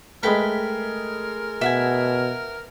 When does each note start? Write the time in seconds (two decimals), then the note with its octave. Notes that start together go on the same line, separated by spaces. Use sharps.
0.23 G#3 A3 A#4 B4 G5 B5
1.61 B2 E5 F#5 G#5